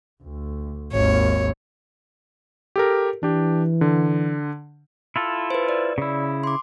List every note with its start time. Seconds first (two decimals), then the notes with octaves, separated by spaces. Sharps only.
0.23 D2
0.93 G#1 D#2 C#5
2.76 G4 A4 A#4
3.23 E3 D4 G4
3.81 D3
5.16 E4 F4 A4
5.50 B4 C5
5.69 D5
5.98 C#3 E4
6.44 C6 D6